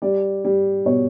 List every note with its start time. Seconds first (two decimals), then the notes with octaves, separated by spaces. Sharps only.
0.02 G3 D5
0.45 G3
0.85 B2 C#5